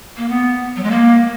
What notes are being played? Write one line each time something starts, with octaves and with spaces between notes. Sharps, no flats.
A#3
B3
F#3
G#3
A#3